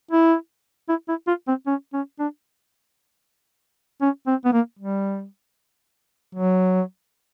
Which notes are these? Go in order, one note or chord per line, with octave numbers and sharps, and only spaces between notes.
E4
E4
E4
F4
C4
C#4
C#4
D4
C#4
C4
B3
A#3
G3
F#3